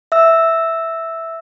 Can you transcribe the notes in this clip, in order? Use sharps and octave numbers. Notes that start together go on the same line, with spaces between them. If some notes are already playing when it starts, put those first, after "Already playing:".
E5 E6